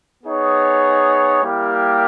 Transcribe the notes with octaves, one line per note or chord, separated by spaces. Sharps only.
B3 D#4 G#4 C#5
G3 A#3 E4 G4 A#4